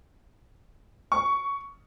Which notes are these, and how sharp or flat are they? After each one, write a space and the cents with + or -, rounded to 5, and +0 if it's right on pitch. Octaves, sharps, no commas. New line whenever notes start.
C#6 +15